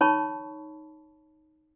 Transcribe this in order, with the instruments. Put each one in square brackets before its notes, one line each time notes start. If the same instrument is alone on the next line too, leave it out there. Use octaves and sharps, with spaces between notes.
[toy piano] D#4 C#5 A5 B5 C#6